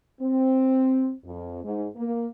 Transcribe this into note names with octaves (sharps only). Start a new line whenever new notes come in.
C4
F2
G#2
A#3